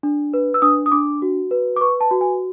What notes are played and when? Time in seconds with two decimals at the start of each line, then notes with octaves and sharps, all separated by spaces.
0.03 D4
0.34 B4
0.54 E6
0.62 D4 D#6
0.86 D#6
0.92 D4 D6
1.22 F#4
1.51 B4
1.76 D6
1.81 B4 C#6
2.01 A5
2.11 F#4
2.21 G#5